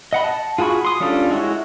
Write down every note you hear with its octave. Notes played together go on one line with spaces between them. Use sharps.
D#5 F#5 B5
A5
F4 F#4 G#4 B5 C#6
C6 D#6
G3 C#4 D4 F4 A4
G#3 E4 F#4 C#5